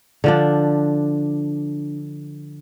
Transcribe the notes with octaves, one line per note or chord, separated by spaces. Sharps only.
D3 F3 D4